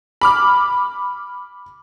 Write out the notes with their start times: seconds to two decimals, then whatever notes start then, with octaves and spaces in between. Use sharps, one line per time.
0.21 B5 D6 F6